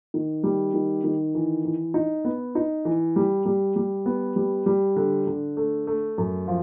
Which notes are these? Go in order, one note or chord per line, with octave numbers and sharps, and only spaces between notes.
D#3
G3
D#3
D#3
E3
E3
D#4
B3
D#4
E3
G3
G3
G3
B3
G3
G3
D3
D3
A3
A3
F#2
F3